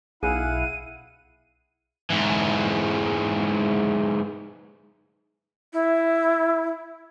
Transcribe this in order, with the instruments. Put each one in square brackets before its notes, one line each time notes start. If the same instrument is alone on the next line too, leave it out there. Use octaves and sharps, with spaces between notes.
[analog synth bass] B1 [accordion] E4 F5 F#5 [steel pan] G#4 [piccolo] D#7
[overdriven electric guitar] G#2 E3
[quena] E4